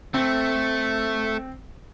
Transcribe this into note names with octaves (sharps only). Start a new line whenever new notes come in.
A3 C4